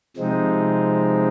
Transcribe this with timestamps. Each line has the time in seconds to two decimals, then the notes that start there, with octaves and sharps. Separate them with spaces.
0.16 C3 F3 G#3 C4 D#4